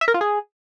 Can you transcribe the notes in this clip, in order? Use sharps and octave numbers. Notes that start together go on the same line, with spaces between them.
E5
A#4
F4
G#4